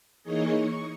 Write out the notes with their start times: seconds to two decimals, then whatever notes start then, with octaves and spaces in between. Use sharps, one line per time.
0.23 E3 A#3 D#4 G#4 C#5 D#5
0.58 C#6